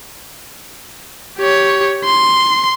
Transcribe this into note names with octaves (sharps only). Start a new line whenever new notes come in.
G4 C#5
C6